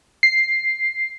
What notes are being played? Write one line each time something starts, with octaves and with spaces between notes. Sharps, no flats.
C7